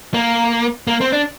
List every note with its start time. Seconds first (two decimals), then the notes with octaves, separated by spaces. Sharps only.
0.14 A#3
0.87 A#3
1.01 C4
1.12 D4